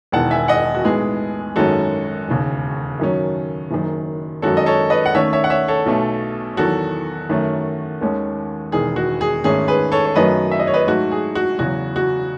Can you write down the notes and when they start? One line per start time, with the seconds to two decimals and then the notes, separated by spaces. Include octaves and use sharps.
0.12 E1 E2 D#3 F#5 A5
0.31 E5 G#5
0.48 D#5 F#5
0.75 F#4
0.84 B1 A2 G#3 B3 G#4
1.56 G#1 F#2 D#3 G#3 C#4 F#4 A4
2.28 E1 D#2 C#3
2.99 F#2 D#3 F#3 C#4
3.71 F#1 F#2 D#3
4.42 F#2 D#3 G#3 C#4 F#4 A4
4.57 D#5
4.66 A4 C#5
4.90 B4 D#5
5.06 F#5
5.15 D#2 D#3 A3 C#4 C#5 E5
5.33 C#5 E5
5.44 F#5
5.50 C#5 E5
5.68 A4 C#5
5.86 B1 B2 A3
6.57 E2 D#3 F#3 F#4 A4
7.29 F#2 D#3 A3 C#4
8.01 D#2 D#3 G#3 C#4
8.72 E1 E2 D#3 G#4
8.96 F#4
9.21 G#4
9.44 G#1 G#2 D#3 A3 C#4 G#4
9.68 G#4 B4
9.92 A4 C#5
10.05 C#5
10.15 F#2 D#3 F#3 A3 C#4 B4 D#5
10.51 E5
10.59 D#5
10.67 C#5
10.74 B4 D#5
10.87 G#2 F#3 A3 F#4
11.11 G#4
11.35 F#4
11.59 E2 C#3 F#3 F#4
11.96 F#4